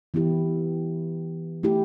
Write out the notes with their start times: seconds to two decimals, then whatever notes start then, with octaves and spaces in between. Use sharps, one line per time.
0.14 E3 B3 E4 G4
1.63 A3 E4 G4